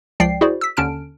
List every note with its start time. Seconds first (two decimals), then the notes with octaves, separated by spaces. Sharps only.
0.20 C#2 F3 D5 G5 C7
0.41 E4 F#4 G#4 C5 D5
0.61 E6 B6
0.77 D#2 D3 C#4 A5 F6 D7